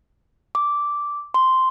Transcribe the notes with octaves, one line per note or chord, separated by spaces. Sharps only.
D6
C6